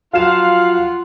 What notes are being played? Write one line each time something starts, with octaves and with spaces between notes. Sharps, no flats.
F3 F#3 F4 F5 F#5 E7